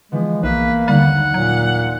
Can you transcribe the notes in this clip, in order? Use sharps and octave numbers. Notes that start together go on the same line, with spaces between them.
E3 F3 G#3 B3
B1 A#3 B4 E5 F#6 C7
D#2 D3 G3 G#3 F#5
A#2 F#3